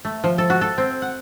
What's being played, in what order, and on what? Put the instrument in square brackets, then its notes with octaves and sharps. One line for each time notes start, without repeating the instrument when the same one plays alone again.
[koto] A3
F3
A4
F#4
A4
C4
F#5